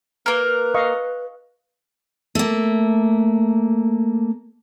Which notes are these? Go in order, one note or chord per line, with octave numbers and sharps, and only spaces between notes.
A#3 A#4 B4
D#5 F5 C#6
A3 A#3